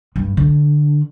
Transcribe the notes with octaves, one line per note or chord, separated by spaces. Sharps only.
G2
D3